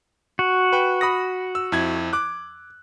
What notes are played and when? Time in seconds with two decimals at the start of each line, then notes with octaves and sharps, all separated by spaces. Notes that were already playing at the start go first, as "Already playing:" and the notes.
0.39 F#4
0.73 B4 G5
1.01 B5 D#6 A#6
1.55 E6
1.72 F2 E4 G#6
2.13 D6 F#6